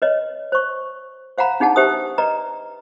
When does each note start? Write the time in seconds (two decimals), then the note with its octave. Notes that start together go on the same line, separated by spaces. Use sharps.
0.02 B4 C#5 D#5
0.52 C5 C#6
1.38 C5 F5 F#5 A#5 B5
1.60 D4 D#4 G#4 F#5 A5
1.76 G4 B4 C5 E5 D#6
2.18 B4 D5 D#5 A#5